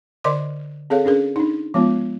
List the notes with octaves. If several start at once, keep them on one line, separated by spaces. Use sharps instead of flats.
D3 A#4 D5 D#5 C6 D6
C4 G#4 A4 C#5 F5
C#4 D4 G#4 A#4
D4 D#4
F3 G#3 B3 F4